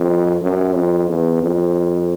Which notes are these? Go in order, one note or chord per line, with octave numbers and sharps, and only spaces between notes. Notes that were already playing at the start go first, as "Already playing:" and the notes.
Already playing: F2
F#2
F2
E2
F2